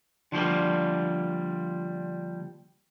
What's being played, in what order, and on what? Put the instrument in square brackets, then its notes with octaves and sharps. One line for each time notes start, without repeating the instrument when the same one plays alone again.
[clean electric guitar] D3 F3 G3 A#3